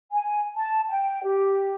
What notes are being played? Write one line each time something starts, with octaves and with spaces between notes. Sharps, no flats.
G#5
A5
G5
G4